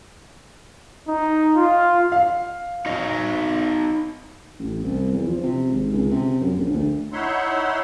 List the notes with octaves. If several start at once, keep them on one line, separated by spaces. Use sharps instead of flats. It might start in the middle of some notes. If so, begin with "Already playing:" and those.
D#4
F4
F5
D#4 F#4 D#5
A1
C2
E2
F3
C3
G#1
C#2
C3
F#2
A#1
D2
D#4 E4 C#5 E5 F#5 C6